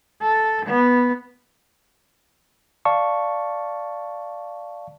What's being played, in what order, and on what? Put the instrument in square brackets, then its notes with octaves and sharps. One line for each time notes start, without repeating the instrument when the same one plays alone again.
[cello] A4
B3
[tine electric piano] D5 F5 A5 C#6